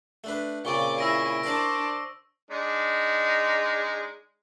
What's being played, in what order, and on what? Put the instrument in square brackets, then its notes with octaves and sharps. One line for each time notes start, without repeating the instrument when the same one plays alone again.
[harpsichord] A3 D4 B4
[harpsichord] A#2 C#3 C4 [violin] D5 [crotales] C#6 G7
[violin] E4 G#4 [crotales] E6 A#6 D7
[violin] D4 C5 [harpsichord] A#4 D5
[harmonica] G#3 D4 D#4